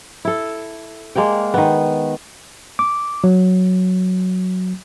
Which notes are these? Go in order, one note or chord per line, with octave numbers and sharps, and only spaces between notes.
E4 A4
G#3 A#3 D5 G5
D#3 B3
D6
F#3